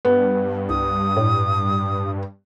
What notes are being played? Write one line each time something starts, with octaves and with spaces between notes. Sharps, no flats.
G2 B3
C2 D#6
A2